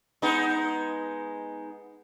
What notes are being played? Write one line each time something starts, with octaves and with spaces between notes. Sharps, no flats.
G#3 B3 D#4